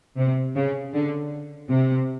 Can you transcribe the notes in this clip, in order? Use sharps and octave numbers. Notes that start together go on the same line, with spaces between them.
C3
C#3
D3
C3